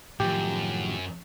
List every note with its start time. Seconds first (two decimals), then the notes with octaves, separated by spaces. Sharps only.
0.20 F#2 A2 D#3 F3 G4